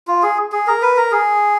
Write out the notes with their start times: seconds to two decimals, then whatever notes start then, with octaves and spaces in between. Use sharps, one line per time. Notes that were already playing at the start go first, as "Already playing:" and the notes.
0.07 F4
0.23 G#4
0.52 G#4
0.67 A#4
0.82 B4
0.96 A#4
1.11 G#4